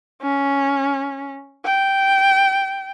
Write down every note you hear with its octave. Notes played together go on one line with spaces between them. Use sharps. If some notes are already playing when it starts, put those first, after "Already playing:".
C#4
G5